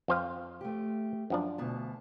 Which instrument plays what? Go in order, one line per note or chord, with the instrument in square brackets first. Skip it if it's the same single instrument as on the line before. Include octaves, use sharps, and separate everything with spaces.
[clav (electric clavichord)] F2 C5 F5
[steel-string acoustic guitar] A3 G4
[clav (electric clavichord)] F#2 F3 D4
[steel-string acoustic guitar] D2 B2 A5